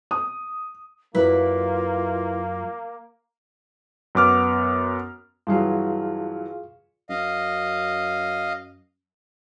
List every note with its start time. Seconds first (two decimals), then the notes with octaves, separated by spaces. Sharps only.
0.11 D#6
1.15 F#2 F#3 A#3 E4 F4 B4
4.15 F#2 B3 D6 F6
5.47 G2 E3 F#3 F4 G#4 F5
7.10 F#2 D#5 F5